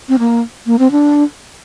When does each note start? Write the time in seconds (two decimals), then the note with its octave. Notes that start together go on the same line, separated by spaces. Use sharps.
0.09 C4
0.19 A#3
0.66 A#3
0.79 C4
0.91 D4